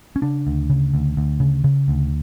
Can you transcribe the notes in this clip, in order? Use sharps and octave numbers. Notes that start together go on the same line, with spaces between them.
C#4
C#3 D4
D2
C#3
D2
D2
C#3
C#3
D2